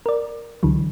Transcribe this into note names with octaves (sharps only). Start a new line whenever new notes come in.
A#4 D5
C#2 D3 E3 F#3